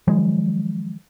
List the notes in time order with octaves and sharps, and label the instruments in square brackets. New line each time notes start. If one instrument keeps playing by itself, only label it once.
[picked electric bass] D#3 F3 F#3 G#3